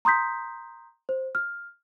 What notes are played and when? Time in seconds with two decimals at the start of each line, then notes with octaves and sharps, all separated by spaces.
0.05 A#5 C6 D#6 G6 B6
1.09 C5
1.35 F6